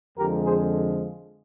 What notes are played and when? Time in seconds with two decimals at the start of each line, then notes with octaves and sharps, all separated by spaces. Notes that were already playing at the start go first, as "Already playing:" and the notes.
0.17 F2 D3 F3 G#3 G4 A#4
0.45 G#4 C5